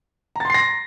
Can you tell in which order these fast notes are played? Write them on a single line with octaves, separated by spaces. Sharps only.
A#5 A6 C6 C7 A#6